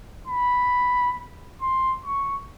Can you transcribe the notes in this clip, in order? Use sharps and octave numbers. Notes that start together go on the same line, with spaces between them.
B5
C6
C#6